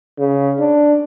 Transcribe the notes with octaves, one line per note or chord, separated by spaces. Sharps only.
C#3
D4